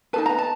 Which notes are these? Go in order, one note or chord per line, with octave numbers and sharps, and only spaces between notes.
D#4 G#4 B4 A5
A#5
A5